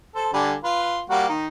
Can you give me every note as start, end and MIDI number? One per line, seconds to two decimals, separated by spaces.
0.15 0.32 69
0.15 0.32 72
0.34 0.54 50
0.34 0.54 55
0.34 0.54 80
0.64 1.00 65
0.64 1.00 71
0.64 1.00 84
1.10 1.29 55
1.10 1.29 58
1.10 1.29 66
1.29 1.48 51
1.29 1.48 63